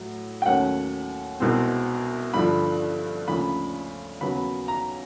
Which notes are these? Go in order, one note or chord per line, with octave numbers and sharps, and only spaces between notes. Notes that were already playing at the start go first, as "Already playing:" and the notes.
Already playing: A2 F#3
G5
D#2 D#3 F#3 A3 C#4 F#5
C2 B2 G#3 C4
G2 D3 F3 B5
D2 C#3 F3 A#3 B5
D#2 C#3 F#3 B3 B5
A#5